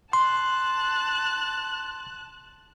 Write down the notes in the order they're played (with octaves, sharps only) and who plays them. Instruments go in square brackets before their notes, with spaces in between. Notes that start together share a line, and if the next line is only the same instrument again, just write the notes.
[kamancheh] A5 F#6 [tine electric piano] C6